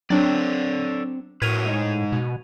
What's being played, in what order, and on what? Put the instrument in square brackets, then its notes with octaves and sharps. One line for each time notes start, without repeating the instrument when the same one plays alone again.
[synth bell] F#3 D4 [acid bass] C4 [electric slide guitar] A4 C#5 D5
[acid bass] A2 [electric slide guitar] F#4 A#4 B4 [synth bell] G#6 D#7 F7
[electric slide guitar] G#3 D#4
[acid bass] B2